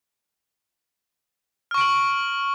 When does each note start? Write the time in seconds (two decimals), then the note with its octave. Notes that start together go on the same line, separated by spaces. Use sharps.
1.71 F6
1.74 C#6
1.78 D7
1.81 F#7